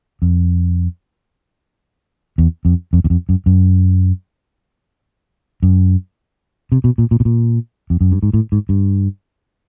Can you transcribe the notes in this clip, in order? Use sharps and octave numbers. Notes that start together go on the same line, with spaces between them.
F2
E2
F2
F2
E2
F2
F#2
F#2
F#2
C3
B2
A#2
A#2
B2
A#2
F2
F#2
G2
G#2
A2
G#2
G2